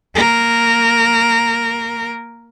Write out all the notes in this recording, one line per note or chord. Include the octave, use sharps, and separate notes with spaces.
A#3 A#4